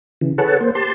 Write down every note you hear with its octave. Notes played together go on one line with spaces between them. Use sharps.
C#3 E3
G#4 A4 B4 C#5 F#5 A5
A#3 C5
G4 A5 C6